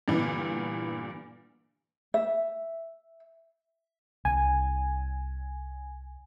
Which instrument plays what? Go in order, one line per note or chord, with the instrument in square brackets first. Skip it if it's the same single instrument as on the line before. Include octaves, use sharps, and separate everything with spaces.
[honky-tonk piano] G2 A#2 D3 E3 B3
[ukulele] E5
[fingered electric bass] C2 [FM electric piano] G#5